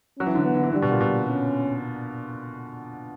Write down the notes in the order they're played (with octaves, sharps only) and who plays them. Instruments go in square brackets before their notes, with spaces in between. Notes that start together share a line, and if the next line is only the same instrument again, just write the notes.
[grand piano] F#3 [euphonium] C#4
[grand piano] E3
D3
[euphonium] B3
[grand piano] D3
E3
[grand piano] D3 [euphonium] G3
[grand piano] B2
A#2
B2
[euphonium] C#4